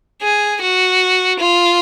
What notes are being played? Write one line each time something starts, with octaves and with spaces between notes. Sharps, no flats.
G#4
F#4
F4